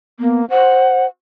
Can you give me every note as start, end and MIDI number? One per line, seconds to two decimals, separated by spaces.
0.20 0.45 58
0.20 0.41 59
0.50 1.07 72
0.50 1.05 78